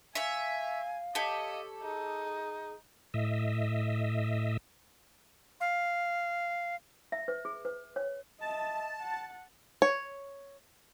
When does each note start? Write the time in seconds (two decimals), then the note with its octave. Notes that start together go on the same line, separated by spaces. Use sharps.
0.15 C#5 E5 F5 G#5
1.15 G4 A4 C#5 D#5
1.82 D#4 G#4
3.14 A2 D#5 E5
5.60 F5
7.12 E5
7.28 B4
7.45 G#4
7.65 B4
7.96 C#5
8.40 D#5 E5 A5
9.01 F#5
9.82 C#5